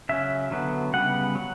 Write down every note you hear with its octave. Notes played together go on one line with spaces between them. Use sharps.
C#3 F#3 C#4 E5
D3 F#3 B3
C#3 G3 B3 F#5
F#3